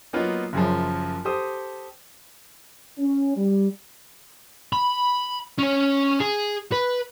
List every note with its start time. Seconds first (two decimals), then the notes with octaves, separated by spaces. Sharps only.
0.13 F#3 A#3 B3 D#4 F4
0.53 F#1 F#2 C#3 F3
1.25 G4 A4 C5 D#6
2.98 C#4
3.37 G3
4.73 B5
5.58 C#4 C#5
6.20 G#4
6.72 B4